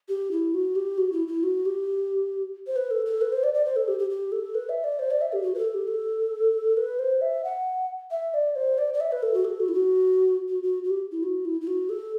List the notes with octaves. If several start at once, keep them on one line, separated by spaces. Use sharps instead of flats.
G4
E4
F#4
G4
F#4
E4
E4
F#4
G4
C5
B4
A4
A4
B4
C5
D5
D5
C5
A4
G4
G4
G4
A4
B4
E5
D5
C5
D5
E5
G4
F#4
B4
A4
G4
A4
B4
C5
E5
F#5
E5
D5
C5
D5
D5
E5
B4
A4
F#4
A4
F#4
E4
F#4
F#4
F#4
F#4
G4
E4
F#4
E4
E4
F#4
A4